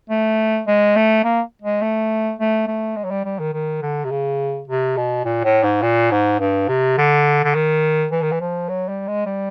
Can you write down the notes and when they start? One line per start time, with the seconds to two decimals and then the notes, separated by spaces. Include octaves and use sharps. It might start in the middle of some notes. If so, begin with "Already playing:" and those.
0.10 A3
0.67 G#3
0.96 A3
1.24 A#3
1.62 G#3
1.82 A3
2.39 A3
2.67 A3
2.96 G#3
3.04 F#3
3.11 G3
3.25 G3
3.39 D#3
3.53 D#3
3.82 D3
4.04 C3
4.11 C#3
4.68 C3
4.97 B2
5.25 A#2
5.44 A2
5.63 G#2
5.82 A#2
6.11 G#2
6.40 G2
6.68 C3
6.98 D3
7.44 D3
7.55 D#3
8.11 E3
8.22 D#3
8.32 E3
8.40 F3
8.69 F#3
8.88 G3
9.07 G#3
9.26 G3